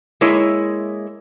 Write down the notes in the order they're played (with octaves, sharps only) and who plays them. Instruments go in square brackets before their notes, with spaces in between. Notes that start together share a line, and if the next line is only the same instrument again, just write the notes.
[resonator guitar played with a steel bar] G#3 A#3 E4 C#5 D#5